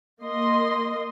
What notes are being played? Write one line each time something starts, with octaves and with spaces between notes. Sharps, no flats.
A#3 D#5 C6